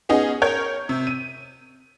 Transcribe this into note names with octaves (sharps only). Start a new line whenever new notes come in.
B3 C#4 D#4 G#4
A#4 C#5 G6 G#6
C3
D#7